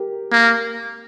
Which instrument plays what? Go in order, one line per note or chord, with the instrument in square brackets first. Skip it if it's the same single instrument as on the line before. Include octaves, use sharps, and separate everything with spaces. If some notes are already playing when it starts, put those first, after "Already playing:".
Already playing: [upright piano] G4 A#4
[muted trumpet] A#3